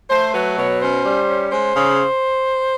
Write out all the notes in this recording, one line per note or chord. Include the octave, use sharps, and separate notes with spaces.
A3 C5
F#3 B4
B2 C#5
C#4 C5
G3
C#4
G#3 C5
C#3